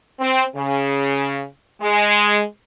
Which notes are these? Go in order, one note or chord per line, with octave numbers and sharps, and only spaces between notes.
C4
C#3
G#3